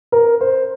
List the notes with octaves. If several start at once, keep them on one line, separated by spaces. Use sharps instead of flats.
A#4
C5